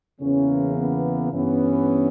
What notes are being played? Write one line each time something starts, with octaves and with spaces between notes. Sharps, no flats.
E2 C#3 E3 A#3 C#4
B3
G2 E3 B3 C#4